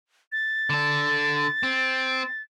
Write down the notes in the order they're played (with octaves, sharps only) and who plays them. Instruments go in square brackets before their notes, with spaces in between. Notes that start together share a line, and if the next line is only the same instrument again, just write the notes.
[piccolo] A6
[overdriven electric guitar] D3 A4
C4